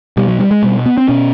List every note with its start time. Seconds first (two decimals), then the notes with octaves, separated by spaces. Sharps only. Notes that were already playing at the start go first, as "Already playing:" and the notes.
0.17 B2 G3
0.28 F#3
0.40 G3
0.51 G#3
0.63 B2 G3
0.86 B3
0.98 C4
1.08 B2 C#4